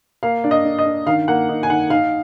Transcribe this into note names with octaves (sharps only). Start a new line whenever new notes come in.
A#3 F5
D4
D#5
D4
D#5
D4
D#3 F5
A#3 F#5
D#4
G#5
D#3 F#5
D#4 F5